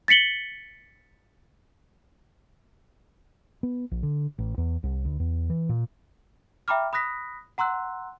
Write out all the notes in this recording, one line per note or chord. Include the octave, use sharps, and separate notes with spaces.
A6 B6 C#7 F#7 G7
B3
A#1
D3
A1
E2
C2
D2
E2
E3
A#2
E5 G5 A#5 B5 D6 F6
B5 D#6 F#6 A#6 B6
F#5 A#5 C6 E6 F#6